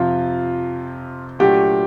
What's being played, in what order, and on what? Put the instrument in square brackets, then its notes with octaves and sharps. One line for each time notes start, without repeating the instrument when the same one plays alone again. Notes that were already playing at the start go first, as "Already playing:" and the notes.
Already playing: [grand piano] F2 C3 F3 [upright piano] F4
[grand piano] A#2 F#3 A3 D4 F#4 [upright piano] G4